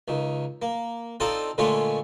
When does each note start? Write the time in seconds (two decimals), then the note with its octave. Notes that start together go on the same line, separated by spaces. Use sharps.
0.08 C#2 D#3
0.62 A#3
1.20 C4 D4 D#4 F4 A4 D5
1.58 A#2 D3 G#3 A3 C#4 F4